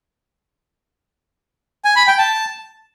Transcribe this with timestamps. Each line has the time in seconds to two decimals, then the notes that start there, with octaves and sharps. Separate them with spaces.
1.85 G#5
1.96 B5
2.07 G5
2.18 A5